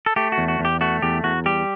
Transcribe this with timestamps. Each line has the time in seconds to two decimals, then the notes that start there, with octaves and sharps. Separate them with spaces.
0.06 A4
0.16 A3 G4
0.32 F#4
0.38 E2
0.48 F#4
0.59 E2
0.65 G4
0.81 A3 F#4
1.02 E2 G4
1.24 E2 F#4
1.46 G3 G4